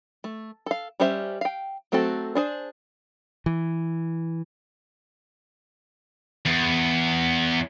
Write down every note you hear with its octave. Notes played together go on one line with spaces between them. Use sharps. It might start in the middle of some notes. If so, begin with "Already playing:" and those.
A3
A4 F5
G3 C#4 G4 C5 E5
F5 G5
F#3 A3 C4 F#4 A4
D4 G#4 C5
E3
E2